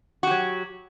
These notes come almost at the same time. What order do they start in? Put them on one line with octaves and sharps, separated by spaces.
F#4 G4 F#3